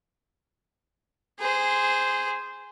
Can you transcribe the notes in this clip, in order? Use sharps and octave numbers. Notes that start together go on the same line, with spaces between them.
G#4 C5